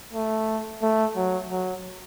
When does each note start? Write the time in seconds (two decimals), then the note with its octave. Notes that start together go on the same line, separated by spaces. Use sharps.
0.13 A3
0.82 A3
1.16 F#3
1.50 F#3